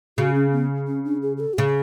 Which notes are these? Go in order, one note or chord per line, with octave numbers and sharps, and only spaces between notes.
C#3 F#4
C#4
B3
C#4
D4
G#4
G#4
A4
F#4
C#3 G#4